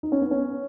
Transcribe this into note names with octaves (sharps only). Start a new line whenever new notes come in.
D#4
C#4
B3
C#4